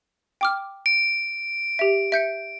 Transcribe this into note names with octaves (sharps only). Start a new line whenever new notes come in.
G5 D6 F6
D7
G4 E5
E5 G6 C#7